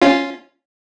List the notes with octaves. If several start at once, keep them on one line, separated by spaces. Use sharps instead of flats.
C#4 F4